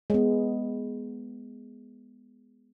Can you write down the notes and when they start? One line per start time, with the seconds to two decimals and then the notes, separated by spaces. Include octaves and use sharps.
0.10 G#3 B3